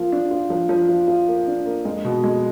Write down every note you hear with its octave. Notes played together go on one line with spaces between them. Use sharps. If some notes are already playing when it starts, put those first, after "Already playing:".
Already playing: F3 A#3 F4
D4
F4
F3
F3
F4
F4
A#3
D4
A#3
G#3
B2
G#3